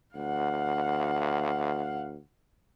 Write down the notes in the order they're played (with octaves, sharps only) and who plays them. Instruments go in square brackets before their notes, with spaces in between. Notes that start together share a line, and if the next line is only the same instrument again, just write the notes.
[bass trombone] D2 [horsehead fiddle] F5 F#5